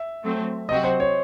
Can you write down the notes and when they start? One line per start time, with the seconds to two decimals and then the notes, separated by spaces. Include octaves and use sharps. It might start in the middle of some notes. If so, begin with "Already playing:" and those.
Already playing: E5
0.23 F#3 A3 C4
0.69 C3 F#3 C4 F#4 D#5
0.84 C5
1.00 C#5